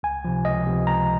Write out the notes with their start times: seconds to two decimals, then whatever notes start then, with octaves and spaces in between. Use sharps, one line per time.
0.03 C#2 G#5
0.25 C3 F3
0.45 C#2 D#5
0.66 C3 F3
0.87 C#2 A#5